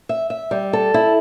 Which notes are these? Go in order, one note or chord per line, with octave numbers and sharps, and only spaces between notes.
E5
E5
G3
A4
E4